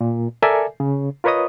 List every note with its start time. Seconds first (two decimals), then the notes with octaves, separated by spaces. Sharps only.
0.01 A#2
0.42 A4 A#4 D5 E5 G#5
0.80 C#3
1.24 F4 A#4 B4 C#5 D#5 D#6